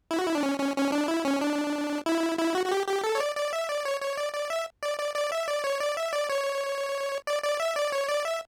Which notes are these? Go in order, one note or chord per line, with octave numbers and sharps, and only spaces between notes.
E4
F#4
E4
D4
C#4
C#4
C#4
D4
E4
C#4
D4
E4
E4
F#4
F#4
G4
G4
A4
C#5
D5
D5
E5
D5
C#5
C#5
D5
D5
E5
D5
D5
D5
E5
D5
C#5
D5
E5
D5
C#5
D5
D5
E5
D5
C#5
D5
E5